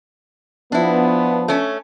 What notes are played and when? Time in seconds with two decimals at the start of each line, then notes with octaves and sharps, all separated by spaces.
0.72 F3 B3 D4 E4
1.48 A3 C#4